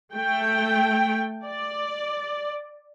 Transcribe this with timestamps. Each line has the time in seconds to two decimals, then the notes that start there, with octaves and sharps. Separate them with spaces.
0.14 A3 G5
1.46 D5